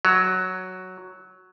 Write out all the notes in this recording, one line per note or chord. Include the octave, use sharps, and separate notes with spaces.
F#3